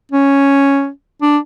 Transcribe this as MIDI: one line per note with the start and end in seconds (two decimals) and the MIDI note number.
0.12 0.89 61
1.22 1.38 62